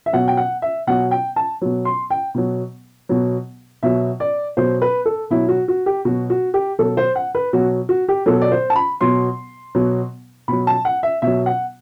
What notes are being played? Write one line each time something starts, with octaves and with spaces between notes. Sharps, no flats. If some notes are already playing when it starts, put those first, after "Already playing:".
E5
B2 F#3 F#5
G5
F#5
E5
B2 F#3 F#5
G5
A5
B2 F#3
C6
G5
B2 F#3
B2 F#3
B2 F#3 E5
D5
B2 F#3 C5
B4
A4
B2 F#3 E4
F#4
F#4
G4
B2 F#3 F#4
F#4
G4
B2 F#3 A4
C5
F#5
B4
B2 F#3 F#4
F#4
G4
B2 F#3 A4
D5
C5
A5
B5
B2 F#3 C6
B2 F#3
B2 F#3 B5
A5
F#5
E5
B2 F#3 E5
F#5